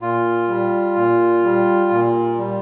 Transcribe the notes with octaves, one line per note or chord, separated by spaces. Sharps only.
A#2 F4
G3
A#2
G3
A#2
G3